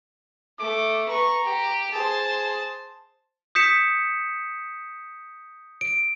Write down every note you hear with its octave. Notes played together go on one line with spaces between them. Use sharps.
A3 D6
B4 A#5 C#6
G4
G#4 C5 A5
D#6 G6 B6 C#7 E7
D7